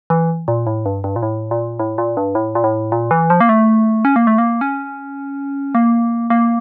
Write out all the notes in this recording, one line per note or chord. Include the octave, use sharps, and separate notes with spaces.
E3
A#2
A2
G2
G2
A#2
A2
A#2
A2
A#2
G2
A2
A#2
A2
A#2
E3
F3
A#3
A3
C#4
A#3
A3
A#3
C#4
A#3
A#3